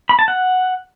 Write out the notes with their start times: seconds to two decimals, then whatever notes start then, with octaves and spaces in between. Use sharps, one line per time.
0.09 B5
0.19 A5
0.28 F#5